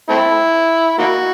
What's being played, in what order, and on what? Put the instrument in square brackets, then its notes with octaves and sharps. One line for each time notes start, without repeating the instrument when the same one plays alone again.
[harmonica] A3 C4 E4
A#3 D#4 F#4